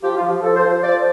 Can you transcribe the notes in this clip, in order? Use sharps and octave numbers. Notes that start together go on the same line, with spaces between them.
F3 G4
F4
F3
F3 A4
C5
F3
C5
F3 D5